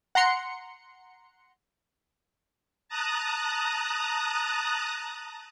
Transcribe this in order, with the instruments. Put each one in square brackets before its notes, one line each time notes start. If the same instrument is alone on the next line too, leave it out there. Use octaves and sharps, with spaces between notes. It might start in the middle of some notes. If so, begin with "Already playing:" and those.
[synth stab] F#5 A#5 C6 C#7
[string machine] A5 A#5 D#6 F#6